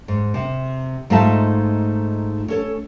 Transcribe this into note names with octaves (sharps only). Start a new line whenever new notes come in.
G#2
C3
G#2 A3 D#4 F4 E5 A5
C#4 A4 C#5